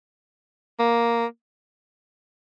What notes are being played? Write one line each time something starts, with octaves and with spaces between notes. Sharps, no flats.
A#3